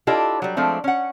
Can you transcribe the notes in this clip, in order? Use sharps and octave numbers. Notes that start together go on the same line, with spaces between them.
D4 E4 F4 G4 A4 D#5
F#3 G3
F3 G#3 A3 C4 D4
C#4 F#5